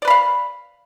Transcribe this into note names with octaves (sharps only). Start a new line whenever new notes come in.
B4 D5 F5 B5